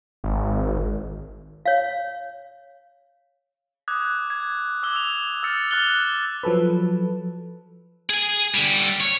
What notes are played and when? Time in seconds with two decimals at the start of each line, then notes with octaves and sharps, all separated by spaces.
0.24 G#1
1.66 C#5 F5
3.88 D6 D#6 F#6 G#6
4.30 G#6
4.83 D6 E6 G7
4.96 F7
5.43 E6 F6 A6 C#7
5.71 D6 F6 F#6 A6 F7 G7
6.43 F3 F#3 A4 B4
8.10 G#4 G#5
8.54 D3 G3
9.00 C#5